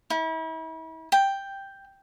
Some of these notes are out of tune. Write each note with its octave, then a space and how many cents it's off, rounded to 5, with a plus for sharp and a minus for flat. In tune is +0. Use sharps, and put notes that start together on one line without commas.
E4 -40
G5 +5